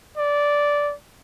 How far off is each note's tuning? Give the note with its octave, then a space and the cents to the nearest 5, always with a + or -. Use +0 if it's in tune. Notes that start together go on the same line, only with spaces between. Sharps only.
D5 -10